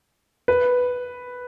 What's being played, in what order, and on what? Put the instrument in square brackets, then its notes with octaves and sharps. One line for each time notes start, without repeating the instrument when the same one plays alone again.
[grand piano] B4